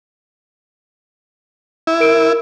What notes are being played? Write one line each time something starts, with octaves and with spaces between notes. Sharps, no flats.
E4
A#4 D7